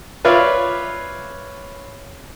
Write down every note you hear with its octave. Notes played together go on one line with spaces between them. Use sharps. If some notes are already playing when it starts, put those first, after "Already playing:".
F4 B4 C#5 D5 E5 F5